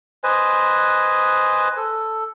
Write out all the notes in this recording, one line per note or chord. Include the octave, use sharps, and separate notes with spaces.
B4 C5 D#5 G#5
A4